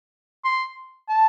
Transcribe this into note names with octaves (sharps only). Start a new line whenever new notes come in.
C6
A5